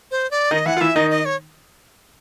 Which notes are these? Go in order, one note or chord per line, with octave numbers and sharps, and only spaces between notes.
C5
D5
D#3 D#4 D#5
E3 E4 F#5
F4
E3 E4 E5
D#3 D#4 D#5
D#5
C#5